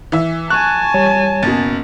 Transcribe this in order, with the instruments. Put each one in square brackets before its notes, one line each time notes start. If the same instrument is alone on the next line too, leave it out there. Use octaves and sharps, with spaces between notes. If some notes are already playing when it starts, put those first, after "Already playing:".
[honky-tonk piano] E3 E5
[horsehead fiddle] G#5 A5 [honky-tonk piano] C#6 [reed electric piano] F#6
[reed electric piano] G3 C#5
[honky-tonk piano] F#1 B2 [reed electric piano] A6